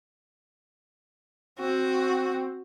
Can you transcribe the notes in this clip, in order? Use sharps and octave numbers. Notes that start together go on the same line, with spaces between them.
C4 F#4